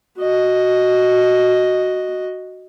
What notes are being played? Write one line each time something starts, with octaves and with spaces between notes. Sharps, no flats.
F#4 D#5